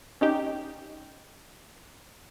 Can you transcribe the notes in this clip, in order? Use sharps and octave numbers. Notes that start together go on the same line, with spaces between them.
C#4 D#4 G4